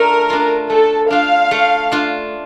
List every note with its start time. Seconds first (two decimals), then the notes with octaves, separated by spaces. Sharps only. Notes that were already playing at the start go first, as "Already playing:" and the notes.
Already playing: A3 D4 F4 A#4
0.30 D4 F4
0.70 A3 A4
1.10 D4 F4 F5
1.51 A3
1.92 D4 F4